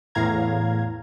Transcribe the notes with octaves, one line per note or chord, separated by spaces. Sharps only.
E2 A2 F5 A#5 G#6